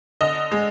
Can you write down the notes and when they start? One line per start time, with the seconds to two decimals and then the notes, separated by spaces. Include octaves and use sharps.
0.21 D3 D#5
0.52 G#3